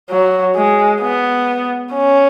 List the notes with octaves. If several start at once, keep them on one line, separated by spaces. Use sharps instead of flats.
F#3
G#3
B3
C#4